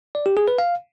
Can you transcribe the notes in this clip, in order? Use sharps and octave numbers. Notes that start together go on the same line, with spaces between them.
D5
G4
G#4
B4
F5